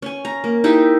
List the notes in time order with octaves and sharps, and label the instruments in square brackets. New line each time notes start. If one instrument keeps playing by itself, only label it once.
[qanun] C#4 G#5
A#5
A#3
D#4 E4 G4